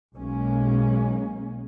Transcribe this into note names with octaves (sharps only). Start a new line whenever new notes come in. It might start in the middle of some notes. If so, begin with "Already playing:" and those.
B1 G#3 A#3 C#4